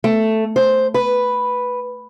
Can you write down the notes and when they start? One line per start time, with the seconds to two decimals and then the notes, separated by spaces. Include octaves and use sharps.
0.04 A3
0.56 C5
0.94 B4